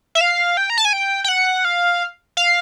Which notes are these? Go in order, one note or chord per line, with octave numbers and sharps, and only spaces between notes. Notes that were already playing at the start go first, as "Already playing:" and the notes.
E5
F5
G5
A#5
A5
G#5
G5
G5
F#5
F5
F5